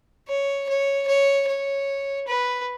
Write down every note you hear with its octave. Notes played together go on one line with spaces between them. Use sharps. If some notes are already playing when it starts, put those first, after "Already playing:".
C#5
C#5
C#5
C#5
B4